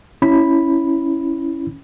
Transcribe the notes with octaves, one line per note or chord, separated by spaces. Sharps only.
C#4 E4 B5